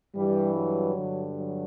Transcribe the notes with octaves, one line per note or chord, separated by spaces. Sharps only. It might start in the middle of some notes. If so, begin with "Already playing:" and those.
G2 E3 G3
F#3
G2 D3
F#3